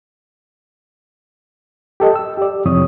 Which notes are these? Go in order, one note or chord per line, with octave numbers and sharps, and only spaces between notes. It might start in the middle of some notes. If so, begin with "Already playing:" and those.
G4 A4 D#5
E6
G4 D5
F2 C3 E3 C#5 D#6